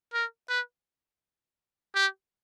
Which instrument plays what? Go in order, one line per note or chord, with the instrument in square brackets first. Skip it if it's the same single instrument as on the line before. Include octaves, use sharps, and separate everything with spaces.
[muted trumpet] A#4
B4
G4